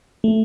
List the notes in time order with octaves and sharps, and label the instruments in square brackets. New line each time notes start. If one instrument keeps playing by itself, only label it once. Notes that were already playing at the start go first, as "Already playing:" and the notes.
[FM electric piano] A3